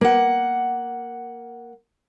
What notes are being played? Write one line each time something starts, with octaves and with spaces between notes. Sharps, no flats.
A#3 F#5